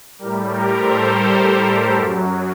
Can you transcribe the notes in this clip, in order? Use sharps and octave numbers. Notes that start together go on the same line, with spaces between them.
A2 G3 G4 A#4
G4 A#4
A4 C5
G4 A#4
F#2 F#3